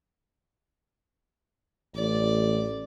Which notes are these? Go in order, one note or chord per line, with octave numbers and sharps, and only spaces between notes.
A1 D5